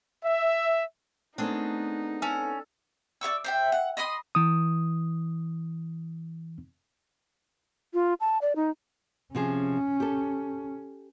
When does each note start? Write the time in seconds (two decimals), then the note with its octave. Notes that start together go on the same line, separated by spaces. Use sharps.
0.24 E5
1.38 A3 B3 C4 D4 D#4 G#4 A#4
2.22 C#4 A4
3.21 D5 E5 C#6 E6
3.44 C5 E5 G5
3.72 F#5
3.97 D#5 B5 C6 D#6
4.35 E3 D#6
7.94 F4
8.20 A5
8.42 D5
8.56 D#4
9.35 C3 F3 C#4 G#4
10.00 G4 A4